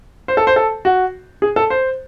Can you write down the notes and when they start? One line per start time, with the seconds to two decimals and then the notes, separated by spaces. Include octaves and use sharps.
0.28 C5
0.37 A4
0.47 C5
0.56 A4
0.85 F#4
1.42 G#4
1.56 A4
1.70 C5